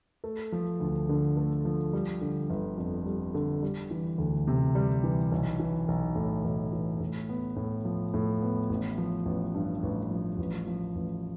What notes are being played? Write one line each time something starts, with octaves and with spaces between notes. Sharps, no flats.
A3
F3
D2
D3
A3
F3
G3
D3
G1
F2
G3
D3
G3
E3
D2
C3
G3
E3
B1
E3
B1
A2
B1
E3
A2
B3
A2
F3
A2
B3
A1
F3
A1
G2
A1
F3
A1
F3
A1